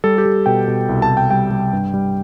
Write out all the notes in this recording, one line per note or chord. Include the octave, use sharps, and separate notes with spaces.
G3 A4
G4
G3
B2 G5
B2
C2
A5
C2
G5
G3 G5
G3
G2
G3